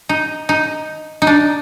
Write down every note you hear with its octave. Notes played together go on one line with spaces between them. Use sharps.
D#4
D#4
D#4
D4